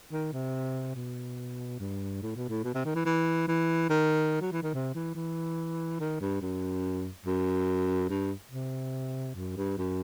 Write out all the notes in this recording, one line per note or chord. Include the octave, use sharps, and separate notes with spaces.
D#3
C3
B2
G2
A2
B2
A2
B2
C3
D#3
E3
E3
E3
D#3
F#3
E3
D#3
C3
E3
E3
D#3
G2
F#2
F#2
G2
C3
F#2
G2
F#2